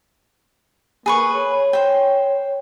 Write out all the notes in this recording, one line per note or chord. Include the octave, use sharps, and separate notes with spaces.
A#3 G#4 B4 C#6
C#5
C5 G5